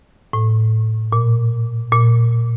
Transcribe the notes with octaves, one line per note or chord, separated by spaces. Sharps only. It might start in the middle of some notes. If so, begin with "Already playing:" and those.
A2
A#2
A#2